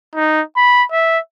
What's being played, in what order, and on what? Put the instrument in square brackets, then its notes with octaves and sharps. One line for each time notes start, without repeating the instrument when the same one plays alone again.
[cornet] D#4
B5
E5